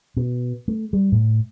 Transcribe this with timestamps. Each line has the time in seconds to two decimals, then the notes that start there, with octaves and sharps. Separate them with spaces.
0.17 B2
0.68 A3
0.93 G3
1.12 A2